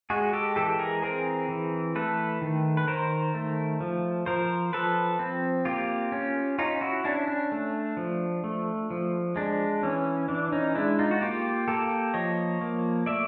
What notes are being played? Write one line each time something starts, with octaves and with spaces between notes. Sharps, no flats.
G#3 F#4 G#4
G4 A4
E3 G4 A4
G#4 A#4
C4 G#4 A#4
E3
A3 A4 B4
D#3
B4
D#3 A#4 C5
A3
F3
F3 A#4 C5
F3 A4 B4
C4
A#3 F4 G4
C#4
C#4 D#4 F4
E4 F#4
C#4 D4 E4
D4
A3
F3
A3
F3
G#3 D4
E3 C#4
E3 D4
C#4 D#4
G#3 D4 E4
D#4 F4
F#4
A#3 F4 G4
A#3 G4 A4
F3 C#5 D#5
A#3
A3 D5 E5